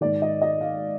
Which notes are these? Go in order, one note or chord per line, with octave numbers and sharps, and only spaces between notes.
G#2 D#3 D5
D#5
D#5
F5